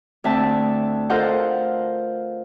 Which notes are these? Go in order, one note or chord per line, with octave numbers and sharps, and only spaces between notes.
D2 C4 E5 A5
F4 A4 A#4 C5 D#5 F#5